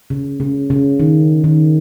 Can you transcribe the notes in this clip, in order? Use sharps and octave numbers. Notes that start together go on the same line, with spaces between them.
C#3
C#3
C#3
D#3
D#3